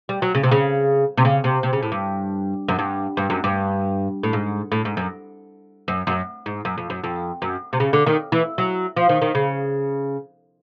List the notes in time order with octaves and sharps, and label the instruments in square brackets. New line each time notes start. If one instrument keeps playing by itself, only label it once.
[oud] G3
F#3
C#3
C3
C#3
C3
C#3
C3
C3
C#3
A2
G2
F#2
G2
G2
F#2
G2
A2
G#2
A2
G#2
F#2
F#2
F#2
G#2
F#2
F2
F#2
F2
F#2
C3
C#3
D3
D#3
E3
F#3
F3
D#3
D#3
C#3